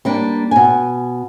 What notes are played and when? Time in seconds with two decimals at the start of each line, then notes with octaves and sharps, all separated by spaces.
0.05 G3 A#3 D4
0.51 B2 G#5